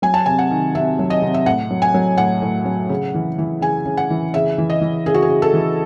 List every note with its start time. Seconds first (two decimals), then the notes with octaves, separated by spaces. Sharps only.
0.02 F#3 G#5
0.14 A5
0.26 C3 G#5
0.39 F#5
0.51 D#3
0.75 C3 E5
0.99 F#3
1.10 D#5
1.22 C3
1.34 E5
1.46 A2 F#5
1.71 F#3
1.82 G#5
1.94 F#3
2.18 A2 F#5
2.42 A2
2.65 F#3
2.89 C#3
3.14 E3
3.38 E3
3.61 C#3 G#5
3.86 C#3
3.97 F#5
4.10 E3
4.34 C#3 E5
4.58 E3
4.70 D#5
4.81 E3
5.06 C#3 G#4
5.14 F#4
5.22 G#4
5.29 C#3
5.42 A4
5.53 E3